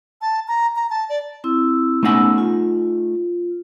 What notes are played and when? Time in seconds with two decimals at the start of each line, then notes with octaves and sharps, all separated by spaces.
0.21 A5
0.48 A#5
0.76 A#5
0.90 A5
1.09 D5
1.44 C4 E4 E6
2.03 A3 B3 C#4 D#4 F#5 E6
2.38 F4